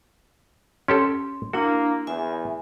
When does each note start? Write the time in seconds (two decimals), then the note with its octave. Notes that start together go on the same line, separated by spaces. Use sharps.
0.88 C#4 G4 A4 C6
1.53 A#3 D4 E4 F#4
2.07 E2 E5 G#5